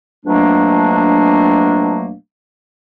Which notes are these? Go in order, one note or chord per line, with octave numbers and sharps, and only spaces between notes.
F2 B2 F#3 A3 A#3 D4